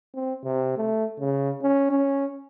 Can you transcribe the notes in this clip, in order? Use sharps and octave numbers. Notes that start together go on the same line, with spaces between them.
C4
C3
A3
C#3
C#4
C#4